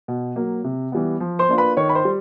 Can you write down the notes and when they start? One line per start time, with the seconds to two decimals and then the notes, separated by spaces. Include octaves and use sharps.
0.08 B2
0.36 F#3 A#3
0.64 C3
0.92 E3 G3 B3
1.20 F3
1.39 C5 C6
1.48 A#3 D4 F4
1.58 B4 B5
1.77 D#3 C#5 C#6
1.89 B5
1.95 C5 C6
2.05 G3